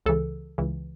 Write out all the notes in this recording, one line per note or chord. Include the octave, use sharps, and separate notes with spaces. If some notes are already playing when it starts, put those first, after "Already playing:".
C#2 C#3 E3 A4
C#2 C#3 E3